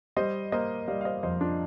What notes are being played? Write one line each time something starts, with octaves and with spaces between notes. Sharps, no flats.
G3 C5 D#5
A#3 C5 D#5
G3 D5 F5
F5
C5 D#5
F2 C5 D#5
D4 F4